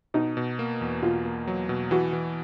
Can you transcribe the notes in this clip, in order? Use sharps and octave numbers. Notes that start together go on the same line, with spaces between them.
B2 D#4
B2
A#3
E2
B2 F4
A#3
F#3
B2
E3 F#4
E3